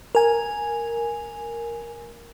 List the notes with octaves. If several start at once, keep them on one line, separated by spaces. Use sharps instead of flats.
A#4 G#5